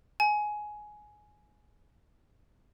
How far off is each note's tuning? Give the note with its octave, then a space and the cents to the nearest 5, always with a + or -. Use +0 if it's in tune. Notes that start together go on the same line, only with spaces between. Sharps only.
G#5 +10